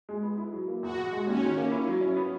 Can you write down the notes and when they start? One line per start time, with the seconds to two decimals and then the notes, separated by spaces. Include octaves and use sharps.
0.09 G#3
0.23 B3
0.38 E4
0.53 F#3
0.68 A#3
0.82 E2 F#4
0.97 B2
1.12 G#3
1.27 D#2 C#4
1.42 D#3
1.57 A#3
1.71 E4
1.87 F#3
2.01 C#4
2.17 B3